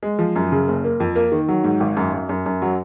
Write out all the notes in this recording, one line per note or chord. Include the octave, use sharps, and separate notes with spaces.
G#3
F3
F#2
C#3
F#1
A#3
F2
A#3
D#3
F#3
G#2
G#1
F#2
F#2
F#2
F#2
F#3